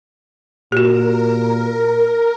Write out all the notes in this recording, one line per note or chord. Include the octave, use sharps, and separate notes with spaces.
A#2 F#4 G4 A#4